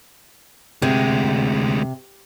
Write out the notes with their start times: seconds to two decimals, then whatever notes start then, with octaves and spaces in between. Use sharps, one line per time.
0.82 D2 C3 G#3